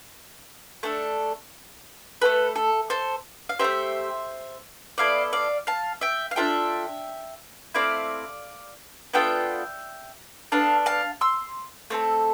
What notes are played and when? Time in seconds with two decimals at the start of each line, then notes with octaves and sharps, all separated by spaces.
0.83 A3 D4 A4
2.21 A3 E4 A4 B4
2.56 A4
2.90 A4 C5
3.49 F5
3.59 C4 G4 C5 E5
3.64 A3
4.98 B3 E4 A4 D5 F5
5.33 D5 F5
5.67 F5 A5
6.01 E5 G5
6.31 F5
6.36 D4 F4 A4 E5 G5
7.74 A3 C4 E4 D5 F5
9.13 B3 D4 F4 A4 E5 G5
10.52 B3 D4 A4 F5 A5
10.86 F5 A5
11.21 C6 E6
11.90 A3 C4 A4